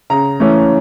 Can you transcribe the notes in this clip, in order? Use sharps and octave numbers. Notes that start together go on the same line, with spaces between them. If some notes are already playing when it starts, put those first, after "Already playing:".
C#3 A#5
E3 A3 C#4